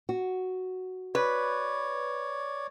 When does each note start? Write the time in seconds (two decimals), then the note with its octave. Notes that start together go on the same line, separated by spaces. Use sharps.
0.09 F#4
1.15 B4 C#5 D5